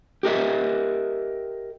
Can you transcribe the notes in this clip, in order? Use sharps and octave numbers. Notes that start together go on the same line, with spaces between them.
G4 A#4 D#5 E5